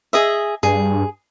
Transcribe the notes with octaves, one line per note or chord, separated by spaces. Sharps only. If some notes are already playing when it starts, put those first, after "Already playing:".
G#4 D#5 E5
G2 G#4